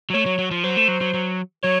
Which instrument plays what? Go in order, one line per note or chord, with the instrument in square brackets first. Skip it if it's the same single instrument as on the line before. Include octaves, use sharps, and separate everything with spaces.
[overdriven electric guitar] F#3
[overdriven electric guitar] A3 [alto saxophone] C#5
[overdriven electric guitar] F#3
F#3
F3
[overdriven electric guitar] F#3 [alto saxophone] C5
[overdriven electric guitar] A3
F#3
F#3
F#3
[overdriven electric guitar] F#3 [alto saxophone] C#5